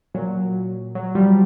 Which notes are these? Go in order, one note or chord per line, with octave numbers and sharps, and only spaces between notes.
A#2 F#3
F#3
F3 G3